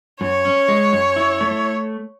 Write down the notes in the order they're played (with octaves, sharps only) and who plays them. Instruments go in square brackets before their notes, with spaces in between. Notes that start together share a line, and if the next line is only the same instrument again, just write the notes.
[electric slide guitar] F#2 [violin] C#5
[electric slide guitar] C#4
G#3
F#2
E4
A3